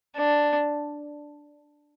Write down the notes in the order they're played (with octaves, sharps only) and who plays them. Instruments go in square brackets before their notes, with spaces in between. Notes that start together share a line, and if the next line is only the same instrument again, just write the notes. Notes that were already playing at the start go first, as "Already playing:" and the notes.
[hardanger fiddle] D4